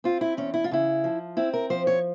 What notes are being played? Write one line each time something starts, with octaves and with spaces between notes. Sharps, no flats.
C4 F4
E4
E2 C#4
E4
F4
C#3 E4
F3
C4 E4
A#4
F3 C5
C#5